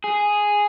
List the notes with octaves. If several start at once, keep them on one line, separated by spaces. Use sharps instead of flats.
G#4